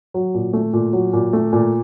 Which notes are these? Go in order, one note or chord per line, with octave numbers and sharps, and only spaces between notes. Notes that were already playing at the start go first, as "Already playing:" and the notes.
F#3
A#2
A3
A#2
F#3
A#2
A3
A#2